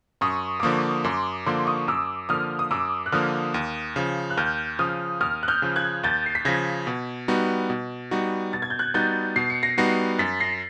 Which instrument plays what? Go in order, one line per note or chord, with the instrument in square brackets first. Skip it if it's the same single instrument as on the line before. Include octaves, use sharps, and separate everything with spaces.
[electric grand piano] F#2 [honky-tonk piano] C#6 D#6
[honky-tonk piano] D6
[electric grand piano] D3 F3 A#3 [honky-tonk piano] C#6 D#6
[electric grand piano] F#2 [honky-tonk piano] C6 D6
[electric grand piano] D3 F3 A#3 [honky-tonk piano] C6 D6
[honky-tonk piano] C#6 D#6
[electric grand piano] F#2 [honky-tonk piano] D6 E6
[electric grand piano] D3 F3 A#3 [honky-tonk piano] D#6 F6
[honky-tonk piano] D#6
[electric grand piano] F#2 [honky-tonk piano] D6 E6
[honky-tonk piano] F#6
[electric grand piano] D3 F3 A#3 [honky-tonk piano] D#6 F6
[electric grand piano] D#2
C#3 F3
[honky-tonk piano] F#6
[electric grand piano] D#2 [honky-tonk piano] F6 G6
[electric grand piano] C#3 F3 [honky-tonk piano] D#6 F6
[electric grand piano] D#2 [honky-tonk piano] D#6 F6
[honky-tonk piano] F#6
F6 G6
[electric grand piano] C#3 F3
[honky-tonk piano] F#6 G#6
[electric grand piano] D#2 [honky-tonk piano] G6 A6
[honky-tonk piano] C7
B6
[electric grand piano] C#3 F3 [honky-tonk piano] G#6 A#6
[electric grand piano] B2
G3 B3 D#4 F#4
B2
G3 B3 D#4 F#4
[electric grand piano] B2 [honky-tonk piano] A6
[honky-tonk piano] G#6
G6
F#6 G#6
[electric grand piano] G3 B3 D#4 F#4 [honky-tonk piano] G6 A6
[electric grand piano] B2 [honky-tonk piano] C7
[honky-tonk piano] C#7
A#6 C7
[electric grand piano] G3 B3 D#4 F#4 [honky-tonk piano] A#6 C7
[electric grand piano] F#2 [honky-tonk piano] A6 B6
[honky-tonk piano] A#6 C7